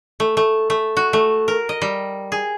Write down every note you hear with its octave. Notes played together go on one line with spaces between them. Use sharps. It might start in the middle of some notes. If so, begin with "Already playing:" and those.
A3
A3
A3
F#4
A3
A#4
D#5
G3
G#4